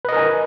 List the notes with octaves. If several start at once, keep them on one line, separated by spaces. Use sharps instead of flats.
A#4 B4 D#5 G#5